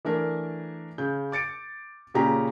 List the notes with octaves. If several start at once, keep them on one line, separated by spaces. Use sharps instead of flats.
E3 A3 D4 A#4
C#3 G6
D6 A6 C#7 D7
A#2 C#3 C#4 G4 A#5